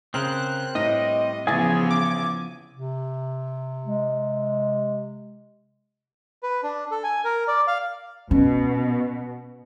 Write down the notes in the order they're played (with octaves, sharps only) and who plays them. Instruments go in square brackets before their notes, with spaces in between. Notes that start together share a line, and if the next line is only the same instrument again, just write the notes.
[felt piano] C#3 [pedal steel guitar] C4 A#4 C5 [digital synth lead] F#6
[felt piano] A2 A#6 [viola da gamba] G3 [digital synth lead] D#5
[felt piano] A1 A6 [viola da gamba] C#3 F3 B3 [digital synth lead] G#4 [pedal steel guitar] G#5
[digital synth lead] D6
[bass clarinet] C3
[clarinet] G#3
[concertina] B4
D4
A4
G#5
A#4
D5
F5
[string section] B2 [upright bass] C#4